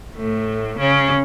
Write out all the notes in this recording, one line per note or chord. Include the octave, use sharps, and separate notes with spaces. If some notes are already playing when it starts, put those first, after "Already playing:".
A2 A3
C#3 C#4